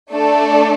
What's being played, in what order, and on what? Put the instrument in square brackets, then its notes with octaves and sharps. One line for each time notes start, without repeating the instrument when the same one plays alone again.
[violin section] A3 D4 A4 D5